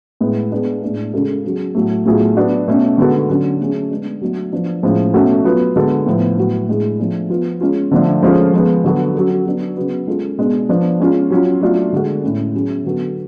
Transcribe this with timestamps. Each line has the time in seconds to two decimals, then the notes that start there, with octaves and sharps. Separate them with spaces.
0.21 A2 G#3 B3
0.51 G#3 B3 D4 G#4
0.82 A2 G#3 D4 G#4
1.13 C#3 G#3 C#4 F#4 A4
1.44 F#3 C#4 G#4
1.75 A2 F#3 A3
2.06 A2 F#3 A3 F4 G#4
2.36 F#3 B3 D4 F#4
2.68 B2 A3 C#4
2.98 D3 G#3 B3 F#4 A4
3.29 D3 F#3 C#4
3.59 F#3 A3 C#4 G#4
3.91 G#3 B3 D4
4.22 F#3 A3 D4
4.52 F3 B3 D4
4.83 A2 F3 G#3 C#4
5.13 B2 A3 C#4 F#4 A4
5.45 F#3 B3 F4
5.76 D3 G#3 B3 F#4 A4
6.06 A2 F3 B3
6.37 A2 F#3 B3 F#4
6.68 A2 G#3 D4 G#4
6.99 F3 A3 D4 G#4
7.29 F3 B3 F4
7.61 G#3 C#4 F4
7.91 D3 F3 A3 D4
8.23 F3 G#3 C#4 F4 A4
8.54 F3 G#3 B3
8.84 D3 F#3 B3 F#4 A4
9.15 F#3 C#4 F#4 A4
9.46 F#3 B3 D4
9.77 C#3 F#3 B3 D4
10.07 G#3 C#4 F4 A4
10.38 B2 G#3 D4
10.69 F3 B3 D4
11.00 G#3 C#4 F4
11.31 F#3 C#4 F4
11.61 F#3 A3 D4 F4
11.93 D3 G#3 D4 F#4 A4
12.23 A2 G#3 C#4
12.54 F#3 C#4 G#4
12.85 D3 F#3 B3 F#4 A4